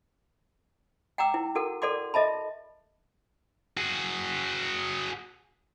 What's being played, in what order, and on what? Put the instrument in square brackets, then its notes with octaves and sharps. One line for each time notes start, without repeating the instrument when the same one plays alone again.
[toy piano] F#5 G5 A#5 D6 E6
E4
F#4 A4 A#4 F#5
A4 A#4 D5 F#5 C6 D6
A4 D#5 E5 A5 B5
[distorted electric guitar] F#4 G#4